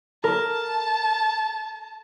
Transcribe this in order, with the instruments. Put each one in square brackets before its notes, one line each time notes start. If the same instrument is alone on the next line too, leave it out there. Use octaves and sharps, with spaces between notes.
[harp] A#4 [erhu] A5